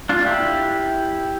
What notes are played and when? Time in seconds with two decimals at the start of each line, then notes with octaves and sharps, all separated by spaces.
0.09 D4 F4
0.26 E4 G4